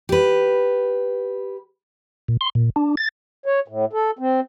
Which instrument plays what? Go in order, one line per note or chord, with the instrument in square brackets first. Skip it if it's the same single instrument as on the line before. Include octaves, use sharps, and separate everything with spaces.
[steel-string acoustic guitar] G4 B4
[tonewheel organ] A#2
C6
A#2
D4
A6
[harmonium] C#5
A2
A4
C4